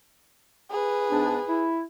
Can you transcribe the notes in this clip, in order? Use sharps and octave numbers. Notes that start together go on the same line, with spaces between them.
G#4 B4
G#2 B3 D4
E4